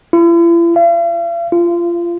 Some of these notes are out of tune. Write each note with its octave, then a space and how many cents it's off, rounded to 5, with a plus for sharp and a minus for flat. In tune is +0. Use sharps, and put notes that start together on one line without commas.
E4 +45
F5 -45
F4 -25